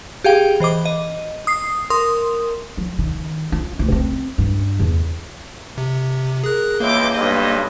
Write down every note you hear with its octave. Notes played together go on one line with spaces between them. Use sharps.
G4 G#4 F5 G5
E3 C5 D#5 D6
D#5
D#6 C7
A#4 C6 D#6
F3
D#3
F4
D2
C4
G2
E2
C3
G#4 A#4 F#6
C#2 E3 A#3 D6 G6
B1 G2 D#5